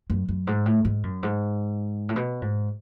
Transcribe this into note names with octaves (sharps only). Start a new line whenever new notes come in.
F#2
F#2
G#2
A2
G#2
F#2
G#2
A2
B2
G#2